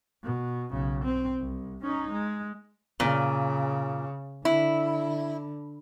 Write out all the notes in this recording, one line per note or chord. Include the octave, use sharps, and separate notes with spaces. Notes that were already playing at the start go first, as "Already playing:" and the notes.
B2
B1 C#3
C4
C2
C#4 D#4
G#3
A#2 C#3
D3 E4